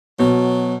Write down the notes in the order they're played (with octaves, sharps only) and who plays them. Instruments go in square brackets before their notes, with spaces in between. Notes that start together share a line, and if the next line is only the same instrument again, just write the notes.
[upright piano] B2 [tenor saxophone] F#3